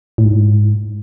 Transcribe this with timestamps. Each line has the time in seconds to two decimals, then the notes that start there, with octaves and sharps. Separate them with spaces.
0.18 A2
0.25 G#2